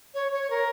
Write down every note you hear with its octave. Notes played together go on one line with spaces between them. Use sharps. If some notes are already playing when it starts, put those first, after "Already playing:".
C#5
C#5
A#4